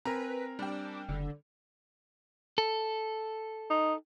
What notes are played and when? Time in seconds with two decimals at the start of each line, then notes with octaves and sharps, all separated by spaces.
0.05 C4 A#4 B4 G#5 A#5
0.59 G3 D4 G5
1.09 F#1 D3
2.58 A4
3.70 D#4